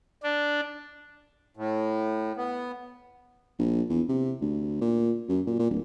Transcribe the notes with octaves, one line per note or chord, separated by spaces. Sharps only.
D4
A2
B3
A#1
E2
C3
D2
A#2
F#2
A#2
A#2
D1